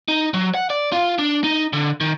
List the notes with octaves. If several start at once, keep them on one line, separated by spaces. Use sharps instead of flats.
D#4
F#3
F#5
D5
F4
D4
D#4
D3
D#3